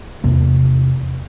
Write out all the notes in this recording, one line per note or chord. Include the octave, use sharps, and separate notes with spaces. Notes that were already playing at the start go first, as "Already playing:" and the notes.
E2 C3 A#3